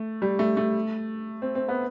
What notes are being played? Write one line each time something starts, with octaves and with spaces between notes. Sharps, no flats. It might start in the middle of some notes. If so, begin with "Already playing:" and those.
Already playing: A3
G3
A3
A3
C4
C4
B3